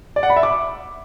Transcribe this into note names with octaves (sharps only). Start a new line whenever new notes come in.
D5
F#5
B5
E5
D6